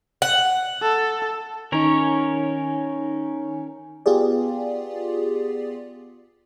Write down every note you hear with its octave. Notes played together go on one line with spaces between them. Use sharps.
F#5
A4
D#3 C#4 D#4 A#4 C#5
B3 F4 G4 G#4 D5